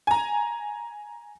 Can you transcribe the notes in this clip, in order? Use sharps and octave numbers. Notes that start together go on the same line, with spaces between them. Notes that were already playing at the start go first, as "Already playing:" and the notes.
G#5 A#5